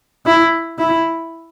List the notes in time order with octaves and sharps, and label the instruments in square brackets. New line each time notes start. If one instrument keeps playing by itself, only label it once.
[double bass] E4
E4